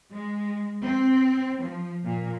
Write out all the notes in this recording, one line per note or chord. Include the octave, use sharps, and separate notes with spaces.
G#3
C4
F3
A#2